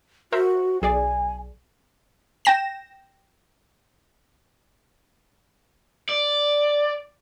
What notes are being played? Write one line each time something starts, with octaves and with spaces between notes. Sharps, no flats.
F#4 A#4 C5 E5
B1 G#4 D5 G#5
G5 A#6 E7
D5